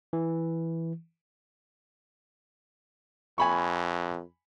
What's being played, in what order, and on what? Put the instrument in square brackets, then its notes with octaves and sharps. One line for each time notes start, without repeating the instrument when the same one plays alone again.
[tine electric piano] E3
[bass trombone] F2 [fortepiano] G#5 B5 C#6